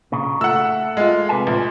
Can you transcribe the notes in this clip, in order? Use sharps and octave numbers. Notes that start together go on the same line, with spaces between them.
A#2 C#3
A3 F#5 E6
G#3 F4
C3 B4 G#5
A#1